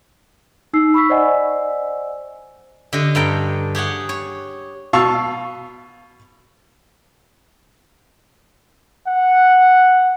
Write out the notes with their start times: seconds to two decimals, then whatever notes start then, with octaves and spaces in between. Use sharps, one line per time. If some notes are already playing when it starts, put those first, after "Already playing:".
0.73 D#4 E6 C7
0.94 B5 C#6 E6 B6
1.10 C5 D5 D#5 F#5 G#5 E6
2.93 D3 G4 D#5
3.15 G2 A4 G5 A#5
3.75 G4 G#4 C#5 F#5
4.09 C#5
4.93 B2 F5 A5 C#6 E6
9.08 F#5